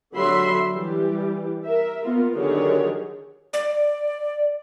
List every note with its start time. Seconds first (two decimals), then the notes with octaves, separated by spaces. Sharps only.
0.14 D3 F#3 F#4 E5 B5 C6
0.73 E3 G3 G4
1.66 A#4 E5
2.04 A#3 B3 F4 A#4
2.37 D3 D#3 F#3 G4 G#4 C#5
3.53 D5